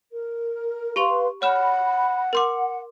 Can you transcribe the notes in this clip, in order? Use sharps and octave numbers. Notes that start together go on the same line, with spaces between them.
A#4
G4 B4 F5 C6 C#6 F7
C#5 F#5 B5 F6 E7
A#4 F#5 C6 D6